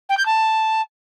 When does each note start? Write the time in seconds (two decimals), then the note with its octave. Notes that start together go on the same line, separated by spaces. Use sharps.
0.09 G5
0.17 G6
0.25 A5